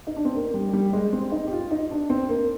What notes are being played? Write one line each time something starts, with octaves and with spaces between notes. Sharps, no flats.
D#4
D4
C4
A#3
G3
G3
G#3
C4
D#4
G4
F4
D#4
D4
C4
A#3